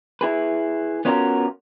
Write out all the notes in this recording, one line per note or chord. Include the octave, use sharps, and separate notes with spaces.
E4 G#4 B4
B3 C#4 F4 F#4 A4 A#4